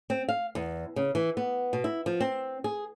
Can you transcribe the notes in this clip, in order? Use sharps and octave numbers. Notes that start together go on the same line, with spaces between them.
C4
F5
E2
C#3
E3
B3
B2
E4
F3
C4
G#4